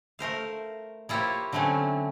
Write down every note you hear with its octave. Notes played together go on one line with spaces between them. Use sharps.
A3 A#4 C5 F5
A#3 E4 F4 G4 C5 C#5
D3 F#3 A3 C4 C#4